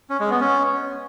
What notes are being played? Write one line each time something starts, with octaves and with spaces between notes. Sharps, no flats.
C#4
G#3
B3
C#4